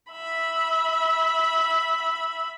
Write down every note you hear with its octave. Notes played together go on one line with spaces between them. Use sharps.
E5 B5